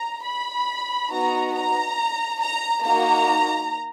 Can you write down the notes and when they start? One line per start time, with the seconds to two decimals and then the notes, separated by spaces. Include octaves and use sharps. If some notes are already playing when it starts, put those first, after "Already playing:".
Already playing: A#5
0.23 B5
1.11 B3 D#4 F#4 A#5
1.54 A#5
2.41 A#5
2.85 A#3 D#4 F#4 A#5